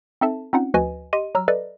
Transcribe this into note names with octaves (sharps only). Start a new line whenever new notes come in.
C4 D#4 A4 E5 A5
C4 C#4 D#4 F4 F#5
D2 F3 F#4 B4 D#5 G#5
G4 D#5 C6 D#7
F#3 A#5 E6 F6
A4 B4 D5 D#5